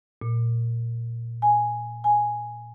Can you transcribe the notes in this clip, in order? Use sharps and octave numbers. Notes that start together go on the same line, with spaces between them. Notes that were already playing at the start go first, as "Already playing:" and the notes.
A#2
G#5
G#5